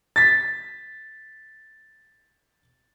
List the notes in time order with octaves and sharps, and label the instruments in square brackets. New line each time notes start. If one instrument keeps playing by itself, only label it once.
[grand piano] A6 B6